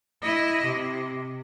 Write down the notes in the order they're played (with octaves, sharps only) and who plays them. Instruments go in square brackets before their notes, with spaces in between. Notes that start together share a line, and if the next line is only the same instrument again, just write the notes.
[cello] E4 D#5
C3